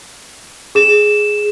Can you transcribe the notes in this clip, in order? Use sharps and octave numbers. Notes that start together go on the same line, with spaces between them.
G#4 E7